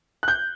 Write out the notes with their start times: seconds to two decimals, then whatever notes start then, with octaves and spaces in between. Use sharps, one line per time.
0.23 F#6
0.28 G6